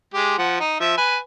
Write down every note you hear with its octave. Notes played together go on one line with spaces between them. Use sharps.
G#3 G4
F3 F#5
D#4
F3 E5
B4 G#5